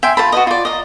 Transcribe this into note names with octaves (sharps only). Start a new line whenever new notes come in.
E5 G5 G#5 C6
F4 C5 A5 B5
F#4 B4 D#5
F4 D5
D#5 F5 A#5